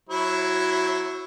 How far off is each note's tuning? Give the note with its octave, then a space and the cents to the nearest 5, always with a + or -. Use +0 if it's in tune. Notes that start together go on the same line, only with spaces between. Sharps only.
F#3 +0 E4 +0 C5 +45